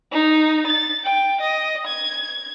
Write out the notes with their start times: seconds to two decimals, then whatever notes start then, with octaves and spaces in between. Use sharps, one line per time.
0.12 D#4
0.66 A6
1.04 G5
1.41 D#5
1.87 G#6